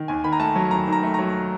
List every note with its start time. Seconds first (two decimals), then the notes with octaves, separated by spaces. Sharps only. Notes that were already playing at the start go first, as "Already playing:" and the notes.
Already playing: D#3
0.08 D#2 G#5
0.24 D#3 B5
0.33 A#5
0.40 A3 A5
0.56 F#3
0.71 D#2 A#5
0.88 D#3 A#5
1.03 A3
1.14 F#3 A#5